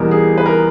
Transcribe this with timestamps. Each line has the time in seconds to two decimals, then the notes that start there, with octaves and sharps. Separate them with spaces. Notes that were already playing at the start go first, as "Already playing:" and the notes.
Already playing: E2 B2 G3 A#4
0.11 G#4
0.38 B4
0.46 A#4